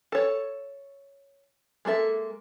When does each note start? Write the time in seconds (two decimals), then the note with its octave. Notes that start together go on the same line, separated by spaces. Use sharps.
0.12 A4 C#5
1.85 G#3 A#3 A4 E5